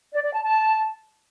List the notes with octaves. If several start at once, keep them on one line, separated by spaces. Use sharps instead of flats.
D5
D5
A5
A5